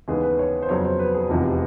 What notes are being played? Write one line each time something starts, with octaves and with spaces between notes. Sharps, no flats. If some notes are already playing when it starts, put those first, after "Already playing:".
D#2 C#3 E3 G#3 B3 G#4
B4
C#5
C5
F2 C#3 F#3 B3 C#5
C5
B4
G#4
F1 E2 C3 F3